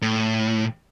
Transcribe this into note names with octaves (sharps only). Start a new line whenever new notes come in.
A2